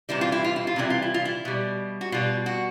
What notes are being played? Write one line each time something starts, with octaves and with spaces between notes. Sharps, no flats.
C3 E3 G3 E4
F4
E4
F4
E4
F4
C3 E3 G3 E4
F4
E4
F4
E4
B2 G3
F#4
B2 G3 F4
F#4